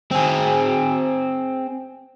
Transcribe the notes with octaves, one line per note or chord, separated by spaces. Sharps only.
C4 G#4